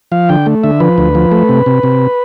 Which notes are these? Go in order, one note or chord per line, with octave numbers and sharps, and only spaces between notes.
F3 F5
D3 G5
A3
D3 E5
F3 B4
D2
F3
A3
C3
C3
C3